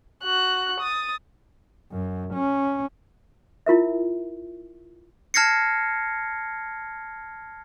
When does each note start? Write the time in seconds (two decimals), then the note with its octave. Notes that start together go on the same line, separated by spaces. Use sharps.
0.24 F#4 F#6
0.80 D#6 A6
1.92 F#2
2.34 C#4
3.66 E4 F4 A#4 E5
5.34 A5 F6 G#6 A#6 C7 C#7